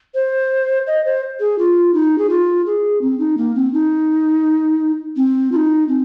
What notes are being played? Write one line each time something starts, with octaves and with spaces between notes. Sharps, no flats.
C5
D#5
C5
G#4
F4
D#4
G#4
F4
G#4
C4
D#4
A#3
C4
D#4
C4
F4
D#4
C4